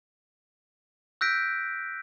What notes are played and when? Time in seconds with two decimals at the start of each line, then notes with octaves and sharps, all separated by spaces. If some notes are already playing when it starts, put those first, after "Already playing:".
1.21 E6 F#6 G6 A#6 B6 D7